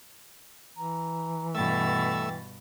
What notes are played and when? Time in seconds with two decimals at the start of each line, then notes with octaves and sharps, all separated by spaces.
0.77 E3 A#5
1.55 G2 B2 A3 E5 G5 E6 A6